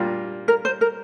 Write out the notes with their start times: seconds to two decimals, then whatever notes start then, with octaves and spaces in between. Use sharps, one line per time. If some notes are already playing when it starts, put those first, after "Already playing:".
Already playing: A#2 G3 A#3 D4 F4
0.48 A#4
0.65 C5
0.81 A#4